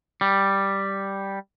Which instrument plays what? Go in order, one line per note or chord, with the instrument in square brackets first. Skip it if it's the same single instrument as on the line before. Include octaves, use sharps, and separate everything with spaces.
[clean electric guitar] G3